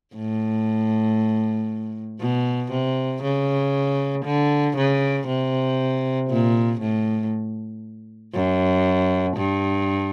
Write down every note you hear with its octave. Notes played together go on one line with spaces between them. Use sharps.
A2
B2
C3
C#3
D3
C#3
C3
A#2
A2
F#2
G2